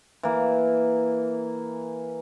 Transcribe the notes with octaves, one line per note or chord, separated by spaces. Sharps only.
E3 A#3